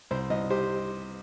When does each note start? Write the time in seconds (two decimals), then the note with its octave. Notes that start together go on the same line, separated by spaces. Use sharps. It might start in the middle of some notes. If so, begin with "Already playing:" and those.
0.11 C2 C5
0.30 C2 D#5
0.50 C3 C5